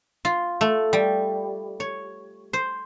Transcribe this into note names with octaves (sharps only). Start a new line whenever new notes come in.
F4
A3
G3
C#5
C5